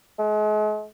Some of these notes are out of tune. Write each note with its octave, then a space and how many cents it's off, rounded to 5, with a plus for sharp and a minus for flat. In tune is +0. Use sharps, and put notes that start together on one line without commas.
G#3 +40